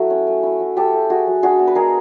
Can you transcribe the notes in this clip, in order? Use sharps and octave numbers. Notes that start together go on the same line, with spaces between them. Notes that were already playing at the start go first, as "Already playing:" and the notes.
Already playing: F#3 A3 E4 F#4
C#4
A3
E4
F#3
C#4 G4 A4
A3
E4 F#4 G#4
F#3
D4 F#4 G#4
B3
B4
G#3 G#4 A#4